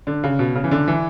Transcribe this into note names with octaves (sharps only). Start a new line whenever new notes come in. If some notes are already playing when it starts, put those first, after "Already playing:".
D3
C#3
B2
C#3
E3
D3
E3